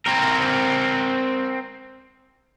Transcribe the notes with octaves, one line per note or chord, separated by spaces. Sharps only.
C4 A#4